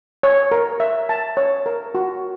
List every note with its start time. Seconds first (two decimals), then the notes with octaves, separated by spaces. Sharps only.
0.23 C#5
0.51 A#4
0.80 E5
1.09 A5
1.37 C#5
1.66 A#4
1.95 F#4